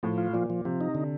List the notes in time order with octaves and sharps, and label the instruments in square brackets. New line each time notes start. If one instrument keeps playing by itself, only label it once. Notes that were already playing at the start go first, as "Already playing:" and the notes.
[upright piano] A2 [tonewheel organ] F3
[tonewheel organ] F4
[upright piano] A#2 [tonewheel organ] F3
[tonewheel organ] F3
[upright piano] C3 [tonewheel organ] F3
[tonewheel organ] D#4
D3